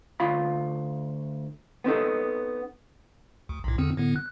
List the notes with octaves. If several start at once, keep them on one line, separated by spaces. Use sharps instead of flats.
D2 F4 F5 B5
B3 C4 D#4 A4
D2
B1 A2
E2 D3 C4
A2 D3 B3
F#6